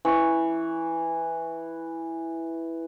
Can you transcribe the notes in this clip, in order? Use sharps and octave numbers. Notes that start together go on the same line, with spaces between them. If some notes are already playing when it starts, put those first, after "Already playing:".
E3 C#6